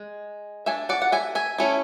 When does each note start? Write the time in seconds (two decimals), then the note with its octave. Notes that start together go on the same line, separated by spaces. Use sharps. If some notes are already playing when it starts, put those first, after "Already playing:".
Already playing: G#3
0.66 A3 D4 E5 G#5
0.89 D5 F#5
1.02 F#5
1.12 E5 G#5
1.35 E5 G#5
1.58 A3 C#4 E4